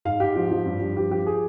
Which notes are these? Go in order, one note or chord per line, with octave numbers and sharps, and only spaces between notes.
G#2 F5
G#2 G4
F3
F3
G2
G2
F3 G4
F3 G4
G#4